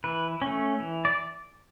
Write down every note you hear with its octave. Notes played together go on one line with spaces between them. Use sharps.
E3 B4
A3 C#4
E3
D5